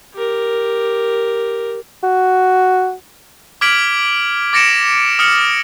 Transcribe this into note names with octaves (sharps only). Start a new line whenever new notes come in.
G4 A#4
F#4
D6 F6 G#6 B6 D7 F#7
D6 A6 A#6 C#7 D7 E7
D#6 F6 C#7 F#7